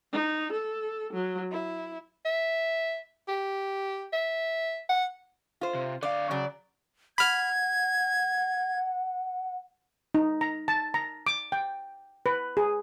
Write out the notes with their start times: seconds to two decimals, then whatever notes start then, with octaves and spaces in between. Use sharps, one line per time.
0.13 D#4
0.53 A4
1.14 F#3
1.52 E4
2.26 E5
3.28 G4
4.13 E5
4.89 F#5
5.61 F4 C5
5.74 C3
6.03 D3 D5 F5
6.31 C#3 F#3 D5
7.18 F#5 B5 F6 G#6
10.15 D#4
10.41 A#5
10.68 A5
10.94 A#5
11.27 D6
11.52 G5
12.26 B4
12.57 G#4